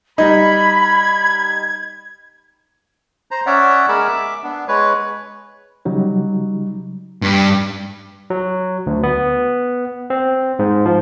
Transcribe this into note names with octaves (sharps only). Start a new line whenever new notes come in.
G3 D#4 B5 G#6
C5 A#5
C#4 C#5 D5 E5 F#5
G#3 G#4 A#4 B5 D6 E6
E5 D6
B3 D4
G#3 B4 C#5
C#3 F#3 G3 D#4
G2
F#3
D2
B3
C4
G#2
F3